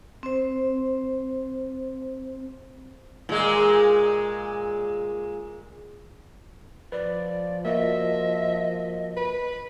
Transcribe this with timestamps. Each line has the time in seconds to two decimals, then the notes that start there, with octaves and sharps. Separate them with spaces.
0.23 C4 C5
3.29 A#2 G#3
6.92 F3 B4 D5
7.65 A#3 F#4 A#4 D#5 E5
9.17 B4